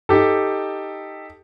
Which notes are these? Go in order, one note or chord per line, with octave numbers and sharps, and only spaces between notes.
D#4 G4 A4